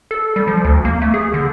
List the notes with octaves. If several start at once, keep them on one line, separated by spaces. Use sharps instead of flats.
A4
G3
F3
D2
A#3
A3
G#4
D3